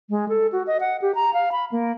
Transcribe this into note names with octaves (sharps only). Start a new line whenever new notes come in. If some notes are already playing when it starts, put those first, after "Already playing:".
G#3
A4
F#4
D#5
F#5
G4
A#5
F5
B5
A#3